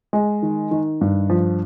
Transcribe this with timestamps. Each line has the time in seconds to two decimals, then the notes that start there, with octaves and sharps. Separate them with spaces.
0.13 G#3
0.42 D#3
0.71 D#3
1.01 G2
1.30 F3